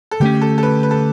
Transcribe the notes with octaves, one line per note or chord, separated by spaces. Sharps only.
A4
D3 A3 C#4 G4
A4
A4
B4
B4
A4